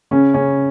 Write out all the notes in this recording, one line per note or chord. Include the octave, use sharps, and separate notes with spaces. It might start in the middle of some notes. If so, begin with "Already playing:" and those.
C#3 C#4
C#3 C#4